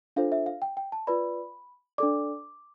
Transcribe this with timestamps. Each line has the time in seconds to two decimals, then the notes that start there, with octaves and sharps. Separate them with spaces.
0.16 D4 F4 A4 C5 F5
0.32 E5
0.46 F5
0.62 G5
0.77 G5
0.92 A5
1.07 F4 B4 D5 B5
1.98 D4 A4 D5 D6